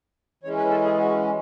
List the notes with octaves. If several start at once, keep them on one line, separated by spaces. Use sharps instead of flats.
E3 G#3 C#4 C#5
B4
A4
G#4
F#4